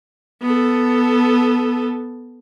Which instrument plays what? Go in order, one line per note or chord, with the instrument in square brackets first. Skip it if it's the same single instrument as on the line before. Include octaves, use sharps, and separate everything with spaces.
[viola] B3 A4